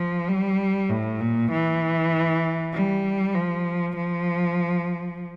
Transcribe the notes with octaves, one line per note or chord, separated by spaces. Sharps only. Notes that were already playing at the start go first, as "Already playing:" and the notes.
Already playing: F3
G3
A2
A#2
E3
G3
F3
F3